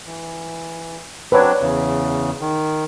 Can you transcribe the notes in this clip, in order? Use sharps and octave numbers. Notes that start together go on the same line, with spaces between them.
E3
F#3 C4 D4 B4 C#5
E2 C#3
D#3